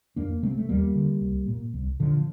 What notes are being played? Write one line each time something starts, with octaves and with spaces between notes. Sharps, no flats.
F2 A#3 D4
C3 A3 C4
A3
D#2 G3 A#3
D3
C2
A#2
C2
A#2 D3 F3